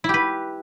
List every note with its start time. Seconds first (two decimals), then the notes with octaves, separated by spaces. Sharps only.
0.04 E4
0.09 G4
0.14 B4